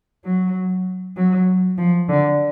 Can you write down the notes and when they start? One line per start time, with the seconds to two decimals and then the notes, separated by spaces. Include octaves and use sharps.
0.25 F#3
1.17 F#3
1.78 F3
2.09 D3